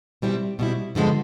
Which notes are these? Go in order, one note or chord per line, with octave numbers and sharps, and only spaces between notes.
B2 G3 C4 E4
B2 G3 C4 E4
G2 D3 F3 G#3 B3